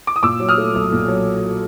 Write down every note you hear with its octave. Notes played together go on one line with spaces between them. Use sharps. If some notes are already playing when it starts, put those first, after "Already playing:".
D6
D#6
A#2 D6 E6
F#3
D#6 F6
A3
B1
A#2
F#3